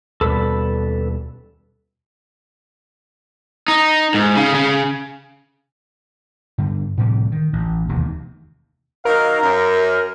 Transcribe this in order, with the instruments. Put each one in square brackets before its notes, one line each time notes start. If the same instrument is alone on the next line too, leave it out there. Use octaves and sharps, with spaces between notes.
[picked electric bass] D#2 B2 G3 [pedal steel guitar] A4 B4 E6
[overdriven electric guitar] D#4
G#2
C#3
C#3
[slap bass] G2 D3
A2 C3 F3 G3
D#3
A1
E1 D#2 C3
[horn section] F#3 D#4 F5 [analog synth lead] A#4
[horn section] F#2